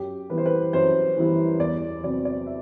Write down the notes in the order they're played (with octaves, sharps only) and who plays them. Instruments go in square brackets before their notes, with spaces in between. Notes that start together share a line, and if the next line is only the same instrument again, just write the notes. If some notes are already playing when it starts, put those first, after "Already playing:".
Already playing: [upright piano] F#2 G4
E3 G3 B3 E4 B4
C5
B4
F#2 C5
E3 G3 B3 E4
E2 D5
C3 F#3 C4 D5
D5
E5